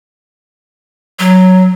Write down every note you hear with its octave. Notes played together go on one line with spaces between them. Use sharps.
F#3